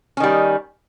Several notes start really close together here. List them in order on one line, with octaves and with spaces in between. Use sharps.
C#4 D#3 G3